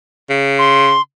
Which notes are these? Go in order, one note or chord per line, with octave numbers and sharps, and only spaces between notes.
C#3
C6